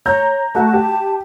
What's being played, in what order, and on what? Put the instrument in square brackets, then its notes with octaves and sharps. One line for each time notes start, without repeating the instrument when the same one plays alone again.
[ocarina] C#5 [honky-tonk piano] A#5 G6
[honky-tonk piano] A3 F#4 [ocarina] A5
[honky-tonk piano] G4